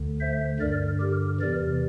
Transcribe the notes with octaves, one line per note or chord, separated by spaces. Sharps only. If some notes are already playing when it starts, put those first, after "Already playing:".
Already playing: D2 D3
C5 E5
G2 D3 A#4 D5
G4 A#4
E2 C3 E3 A#4 D5